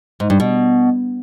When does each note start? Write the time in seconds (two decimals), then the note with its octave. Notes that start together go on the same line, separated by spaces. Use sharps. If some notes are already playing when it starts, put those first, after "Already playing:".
0.20 G#2
0.30 G2
0.40 B2